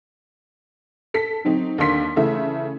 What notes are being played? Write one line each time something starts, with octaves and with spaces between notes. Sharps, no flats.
A4 B6
F#3 C4 D#4
D#2 D3 A#3 C6 B6
C#3 E3 A3 E5